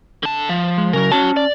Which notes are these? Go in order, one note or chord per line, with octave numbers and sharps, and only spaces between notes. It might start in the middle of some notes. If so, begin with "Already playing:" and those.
D3 A5
F3
G#3
C#3 F#3 A#4
C#4 F#4 C#5 A5
D5